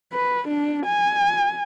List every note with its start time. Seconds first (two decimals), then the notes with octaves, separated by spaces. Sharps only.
0.13 B4
0.48 D4
0.86 G#5